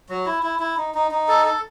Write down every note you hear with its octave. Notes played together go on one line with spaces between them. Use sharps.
F#3
E4
E4
E4
D#4
D#4
D#4
A4
A4